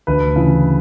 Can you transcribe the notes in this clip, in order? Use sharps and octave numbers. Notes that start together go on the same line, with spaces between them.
D2 B4
C#3 E3